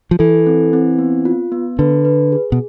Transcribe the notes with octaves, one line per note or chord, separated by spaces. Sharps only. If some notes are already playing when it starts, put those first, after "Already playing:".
F3
E3 A4
C4
C4
B3
F4
B3
D3 B4
B4
G#4
B2